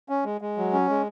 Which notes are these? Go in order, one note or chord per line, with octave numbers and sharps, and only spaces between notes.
C#4
G#3
G#3
F#3
C#4
G#3